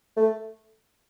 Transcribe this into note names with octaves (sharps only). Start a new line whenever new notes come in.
A3